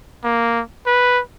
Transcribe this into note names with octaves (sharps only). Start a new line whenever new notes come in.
A#3
B4